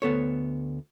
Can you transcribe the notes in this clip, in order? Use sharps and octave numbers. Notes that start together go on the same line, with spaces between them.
D2 B3 A4 C#5